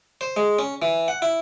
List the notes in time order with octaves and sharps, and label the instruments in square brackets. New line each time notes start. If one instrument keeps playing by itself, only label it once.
[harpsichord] C5
G#3
C#4
E3
F#5
E4